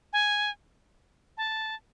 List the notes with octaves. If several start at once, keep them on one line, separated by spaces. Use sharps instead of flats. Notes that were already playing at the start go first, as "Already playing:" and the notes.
G#5
A5